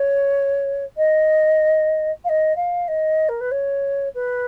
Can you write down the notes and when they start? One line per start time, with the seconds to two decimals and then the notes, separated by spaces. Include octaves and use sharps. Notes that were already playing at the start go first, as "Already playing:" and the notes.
Already playing: C#5
0.97 D#5
2.24 F5
2.29 D#5
2.56 F5
2.88 D#5
3.29 A#4
3.41 B4
3.51 C#5
4.15 B4